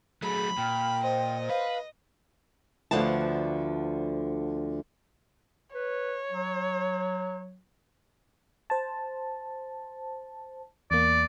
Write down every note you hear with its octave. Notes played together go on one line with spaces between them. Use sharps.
F#3 A3 G#4 B5
A#2 G5 F6
C5 D#5
B4 F5
D2 D3 F3 B3 A5
B4 C#5
F#3
C5 A5
E2 A#3 D5